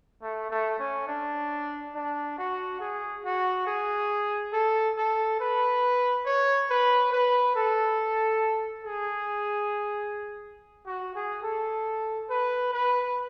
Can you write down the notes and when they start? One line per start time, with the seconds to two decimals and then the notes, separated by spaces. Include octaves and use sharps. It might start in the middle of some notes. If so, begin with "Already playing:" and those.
0.22 A3
0.50 A3
0.79 C#4
1.08 D4
1.95 D4
2.38 F#4
2.80 G#4
3.24 F#4
3.67 G#4
4.53 A4
4.97 A4
5.40 B4
6.25 C#5
6.70 B4
7.12 B4
7.55 A4
8.84 G#4
10.86 F#4
11.15 G#4
11.43 A4
12.30 B4
12.73 B4